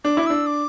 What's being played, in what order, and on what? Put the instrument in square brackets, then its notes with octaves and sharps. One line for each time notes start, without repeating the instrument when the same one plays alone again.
[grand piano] D4 [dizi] D6
[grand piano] E4
[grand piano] D4 [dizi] E6
[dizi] D6